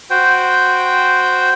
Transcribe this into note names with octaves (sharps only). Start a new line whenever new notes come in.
F#4 C5 G5